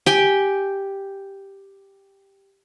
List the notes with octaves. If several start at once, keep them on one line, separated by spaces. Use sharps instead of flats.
G4 G5 G#5